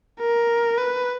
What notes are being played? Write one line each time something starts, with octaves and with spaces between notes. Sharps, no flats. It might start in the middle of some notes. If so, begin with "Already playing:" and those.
A#4
B4